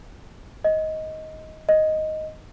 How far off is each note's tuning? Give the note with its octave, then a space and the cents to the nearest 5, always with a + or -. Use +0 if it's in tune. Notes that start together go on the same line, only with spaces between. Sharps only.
D#5 +15
D#5 +0